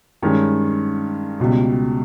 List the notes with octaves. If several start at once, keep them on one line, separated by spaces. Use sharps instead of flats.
G2 D#3 G#3 C#4
C#2 B2 G3